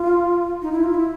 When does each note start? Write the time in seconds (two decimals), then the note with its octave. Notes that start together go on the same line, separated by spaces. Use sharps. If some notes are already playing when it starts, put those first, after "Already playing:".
Already playing: F4
0.62 D#4
0.72 E4
0.84 F4
0.94 E4